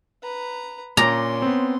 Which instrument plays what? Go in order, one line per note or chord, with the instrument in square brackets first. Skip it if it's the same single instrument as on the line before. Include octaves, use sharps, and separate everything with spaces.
[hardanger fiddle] B4 A#5
[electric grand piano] A#2 D6 [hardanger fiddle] C#4 C6 [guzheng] A#5
[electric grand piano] B3 C4